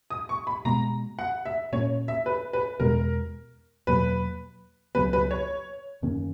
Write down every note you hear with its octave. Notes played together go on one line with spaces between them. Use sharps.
D#6
C#6
B5
B2 G#3 B3 A#5
F#5
E5
A#2 A#3 C#4 C#5
E5
B4
B4
E2 B2 G#3 B3 A#4
E2 B2 F#3 A#3 B4
C#2 C#3 F#3 B3 B4
B4
C#5
F#2 D#3 A#3 C#4